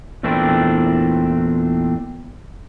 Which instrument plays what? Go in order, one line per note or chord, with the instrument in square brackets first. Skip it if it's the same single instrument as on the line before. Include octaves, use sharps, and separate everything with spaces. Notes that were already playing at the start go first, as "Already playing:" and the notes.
[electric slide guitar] E2 A#2 A3 C4 D4 E4